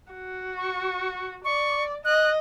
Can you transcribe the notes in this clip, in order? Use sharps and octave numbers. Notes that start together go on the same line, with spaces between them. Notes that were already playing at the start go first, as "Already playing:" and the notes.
F#4
C#6
D5 C#6
D#5 F#6